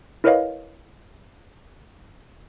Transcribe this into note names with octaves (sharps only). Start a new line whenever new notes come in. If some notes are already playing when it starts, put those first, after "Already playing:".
E4 A#4 B4 C#5 D#5 F5